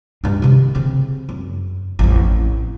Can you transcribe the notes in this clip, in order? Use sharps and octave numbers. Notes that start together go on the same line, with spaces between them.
G2 D4
C3 D#3
C#3 C4
F#2
A1 F2